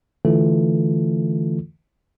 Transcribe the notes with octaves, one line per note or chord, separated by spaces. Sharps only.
D3 E3 A3 F4 A4